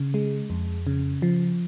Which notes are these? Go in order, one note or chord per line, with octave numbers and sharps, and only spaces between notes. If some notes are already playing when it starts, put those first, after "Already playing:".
Already playing: C#3
G#3
F2
C#3
F3